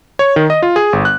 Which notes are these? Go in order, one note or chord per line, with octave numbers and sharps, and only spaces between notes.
C#5
D#3
D#5
F4
G#4
G1
F#6